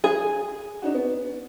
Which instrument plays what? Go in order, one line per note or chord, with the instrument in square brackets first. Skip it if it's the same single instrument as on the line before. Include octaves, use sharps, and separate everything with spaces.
[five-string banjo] G#4
[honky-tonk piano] D4 D#4 F#4
B3